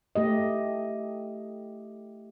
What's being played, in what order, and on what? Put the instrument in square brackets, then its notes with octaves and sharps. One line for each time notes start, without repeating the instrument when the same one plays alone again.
[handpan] A3 G4 D#5